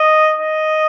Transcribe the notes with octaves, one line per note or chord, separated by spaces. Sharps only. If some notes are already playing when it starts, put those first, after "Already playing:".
Already playing: D#5
D#5